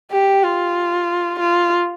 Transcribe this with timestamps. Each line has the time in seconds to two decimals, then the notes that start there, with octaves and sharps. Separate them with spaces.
0.11 G4
0.43 F4
1.40 F4